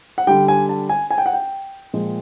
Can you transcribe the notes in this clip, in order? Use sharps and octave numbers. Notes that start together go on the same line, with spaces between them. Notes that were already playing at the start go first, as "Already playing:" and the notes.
F#5
D3 G3 G5
G#5
A5
G#5
G#5
G5
F#5
G5
A#2 F3 G#3